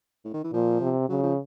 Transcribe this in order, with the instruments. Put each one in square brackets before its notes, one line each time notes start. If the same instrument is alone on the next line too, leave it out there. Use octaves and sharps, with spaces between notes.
[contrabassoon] A2
D#3
E3
[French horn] A#2 [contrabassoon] F3
[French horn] C3
[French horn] C#3 [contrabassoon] F#3
[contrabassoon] F3